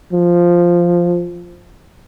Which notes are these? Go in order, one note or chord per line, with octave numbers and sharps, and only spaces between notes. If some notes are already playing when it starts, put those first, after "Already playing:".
F3